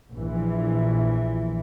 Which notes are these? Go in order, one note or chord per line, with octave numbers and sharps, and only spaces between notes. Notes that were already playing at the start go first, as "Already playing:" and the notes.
A#1 E3